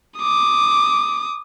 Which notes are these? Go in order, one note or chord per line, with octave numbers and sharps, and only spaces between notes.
D6 D#6